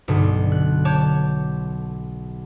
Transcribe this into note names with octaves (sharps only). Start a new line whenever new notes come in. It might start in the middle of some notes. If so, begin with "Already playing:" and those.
B1 G2 B2 D3
F#6
C#5 A5 D6 G6